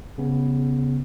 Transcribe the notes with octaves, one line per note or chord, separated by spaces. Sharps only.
C#3 B3